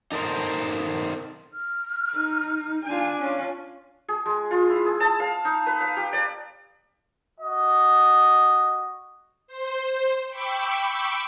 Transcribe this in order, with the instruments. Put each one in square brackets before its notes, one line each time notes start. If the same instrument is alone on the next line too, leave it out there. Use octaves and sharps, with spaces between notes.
[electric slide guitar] D#4 A4 A#4 C5
[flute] F6
[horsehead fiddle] D#4
[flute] D4 [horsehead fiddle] F4 G#5
[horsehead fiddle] C#4 F4
[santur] G#4
G#3
F4
E4
G#4
A5
F5
D#4
B4
F5
G4
D5
[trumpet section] F#4 D#5
[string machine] C5
G5 B5 C#6 D6 E6